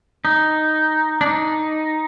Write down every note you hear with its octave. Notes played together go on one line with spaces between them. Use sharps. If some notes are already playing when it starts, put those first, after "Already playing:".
D#4
D4
D#4